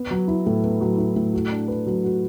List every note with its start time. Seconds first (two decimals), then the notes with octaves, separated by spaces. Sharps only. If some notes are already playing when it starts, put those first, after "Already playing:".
Already playing: B3
0.11 F#3
0.28 E4
0.46 A2
0.64 B3
0.81 F#3
0.98 E4
1.16 A2
1.33 F#4
1.50 D4
1.68 B4
1.87 F#3
2.04 F#4